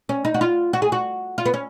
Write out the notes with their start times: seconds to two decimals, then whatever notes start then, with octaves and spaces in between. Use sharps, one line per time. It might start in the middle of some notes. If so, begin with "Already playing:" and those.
0.09 C#4
0.25 D#4
0.34 F#4
0.41 F4
0.73 F#4
0.82 G#4
0.92 F#4
1.38 F4
1.46 B3
1.54 C#4